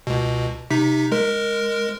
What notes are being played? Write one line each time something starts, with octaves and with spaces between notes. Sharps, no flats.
C#2 B2
C3 D#4 B6
G#3 A#4